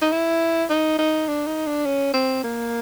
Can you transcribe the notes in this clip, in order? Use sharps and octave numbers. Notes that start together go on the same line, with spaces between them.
D#4
E4
D#4
D#4
D4
D#4
D4
C#4
C4
A#3